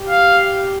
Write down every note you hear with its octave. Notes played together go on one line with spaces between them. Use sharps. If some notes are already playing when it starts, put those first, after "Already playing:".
Already playing: G4
F5